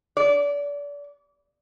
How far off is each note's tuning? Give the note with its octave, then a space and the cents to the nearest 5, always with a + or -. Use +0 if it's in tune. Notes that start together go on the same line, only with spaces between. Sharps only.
D5 -30